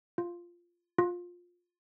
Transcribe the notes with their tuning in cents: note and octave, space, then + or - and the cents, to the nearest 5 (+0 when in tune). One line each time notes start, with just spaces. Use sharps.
F4 -5
F4 +15